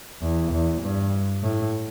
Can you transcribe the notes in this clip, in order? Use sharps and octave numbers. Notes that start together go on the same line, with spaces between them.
E2
E2
G2
A2